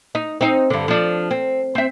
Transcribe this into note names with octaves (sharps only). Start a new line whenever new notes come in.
D#4
C4 D#4
G2 D3
F3 D4
C4
C4 E5